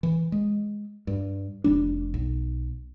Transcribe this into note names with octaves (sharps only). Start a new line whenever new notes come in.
E3
G#3
G2
F1 G3 D4
B1